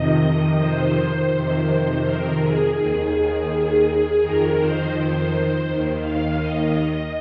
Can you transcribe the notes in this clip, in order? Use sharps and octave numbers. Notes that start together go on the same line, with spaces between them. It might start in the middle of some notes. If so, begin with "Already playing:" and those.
Already playing: F2 C3 D#3 D#5
C5
F2 C3 D#3
A#4
G#4
D#2 D#3
F2 D#3 A#4
C5
D#2 D#3
F5
D#5